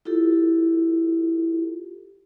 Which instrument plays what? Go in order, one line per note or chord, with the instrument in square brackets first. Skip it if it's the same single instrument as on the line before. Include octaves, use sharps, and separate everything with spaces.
[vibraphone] E4 F4 G4 A4